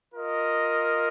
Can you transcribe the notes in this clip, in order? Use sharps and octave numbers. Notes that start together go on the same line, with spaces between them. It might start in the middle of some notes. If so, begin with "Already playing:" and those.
F4 A#4 D#5